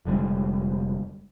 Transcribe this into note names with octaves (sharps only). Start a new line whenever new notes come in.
F1 D3 G3 G#3